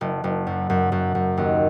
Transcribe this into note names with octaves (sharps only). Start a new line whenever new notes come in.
F#1
F#1
F#2
F#2
F#2
F#2
D#2